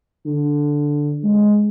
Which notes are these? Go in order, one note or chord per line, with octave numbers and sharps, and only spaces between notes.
D3
G#3